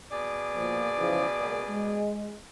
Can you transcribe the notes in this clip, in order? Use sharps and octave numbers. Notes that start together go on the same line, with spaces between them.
B2 G#4 D5
A#2 F3
C#3 E3 F3
C#2 A#2
G#3